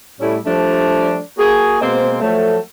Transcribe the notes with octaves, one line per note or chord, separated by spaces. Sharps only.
A2 G3 A3 C#4 E4
F3 G3 A3 D4
A#3 F#4 G#4
B2 G#3 A#3 C4 C5
F3 F#3 A3